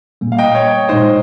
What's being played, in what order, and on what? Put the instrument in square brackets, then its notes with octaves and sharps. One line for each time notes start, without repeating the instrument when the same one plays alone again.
[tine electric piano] A#2 G3 A#3
[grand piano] F5
D#5 G5
C#5
[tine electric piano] A#2 G#3 D#4 [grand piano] C5 D#5